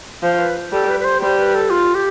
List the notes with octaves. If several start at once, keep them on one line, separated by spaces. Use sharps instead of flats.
F3 C5
B4
G3 A4
B4
B4
C5
G3 C5
B4
A4
F4
G4